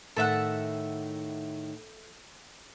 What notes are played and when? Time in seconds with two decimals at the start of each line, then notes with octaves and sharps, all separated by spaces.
0.17 A2 D#3 A4 E5 F#5